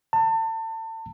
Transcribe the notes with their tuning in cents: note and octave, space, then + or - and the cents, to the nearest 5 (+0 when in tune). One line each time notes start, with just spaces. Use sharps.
A5 +30